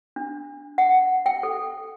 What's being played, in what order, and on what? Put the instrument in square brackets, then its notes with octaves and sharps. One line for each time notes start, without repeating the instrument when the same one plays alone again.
[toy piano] D4
F#5
G5
A4